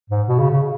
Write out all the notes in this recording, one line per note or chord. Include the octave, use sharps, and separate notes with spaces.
G#2
B2
C#3
C#3